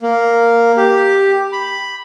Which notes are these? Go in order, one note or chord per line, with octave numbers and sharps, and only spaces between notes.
A#3
G4
B5